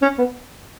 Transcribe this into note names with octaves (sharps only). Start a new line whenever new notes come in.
C#4
B3